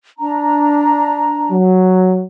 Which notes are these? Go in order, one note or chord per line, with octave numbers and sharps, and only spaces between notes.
D4 A#5
F#3